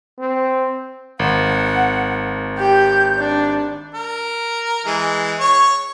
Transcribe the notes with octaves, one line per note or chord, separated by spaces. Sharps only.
C4
G#1 F#5
G4 G6
D4
A#4
E3 G#3
C#5 C#6